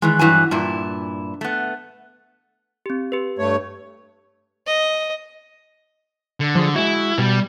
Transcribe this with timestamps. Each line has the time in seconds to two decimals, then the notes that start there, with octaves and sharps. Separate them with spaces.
0.02 D#3 E3 G#3
0.19 G2 E3 F#3 G#5
0.51 G2 A#2 E4
1.41 A3 B3
2.86 C4 G4
3.12 G4 B4
3.38 G2 A3 C#5
4.67 D#5
6.40 D3
6.55 F3 F4 G#4
6.76 G#3 E4 F#4
7.18 B2 G3